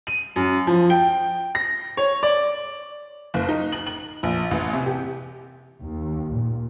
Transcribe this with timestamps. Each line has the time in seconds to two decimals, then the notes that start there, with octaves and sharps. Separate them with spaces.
0.07 D#7
0.36 F#2
0.67 F3
0.90 G5
1.55 A#6
1.97 C#5
2.23 D5
3.34 F#1
3.49 D#4
3.72 F#7
3.87 F#7
4.23 A#1
4.51 A1
4.73 C3
4.86 G4
5.82 D#2
6.34 A#2